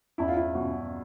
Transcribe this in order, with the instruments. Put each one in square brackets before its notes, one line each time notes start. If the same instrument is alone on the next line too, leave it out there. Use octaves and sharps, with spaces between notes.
[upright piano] E2 E4
F4
E4
B2 F#3